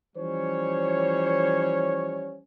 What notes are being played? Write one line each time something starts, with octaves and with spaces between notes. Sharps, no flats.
E3 F3 G3 C#4 C5 C#5